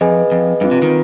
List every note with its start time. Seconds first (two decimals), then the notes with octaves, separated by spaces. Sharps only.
0.01 F2 G#4 B4 D#5 G#5
0.32 F2
0.61 G2 C4 F4 B4
0.71 C3
0.82 D#3